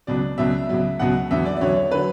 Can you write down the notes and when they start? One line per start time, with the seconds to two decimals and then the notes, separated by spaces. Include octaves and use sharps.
0.07 C#2 B2 F#3 D5
0.38 C#2 B2 F#3 E5
0.69 C#2 B2 F#3
0.99 C#2 B2 F#3 F#5
1.31 E2 D3 F#3 E5
1.46 D5
1.56 D5
1.61 E2 D3 F#3 C#5
1.76 C#5
1.91 D3 F#3 B4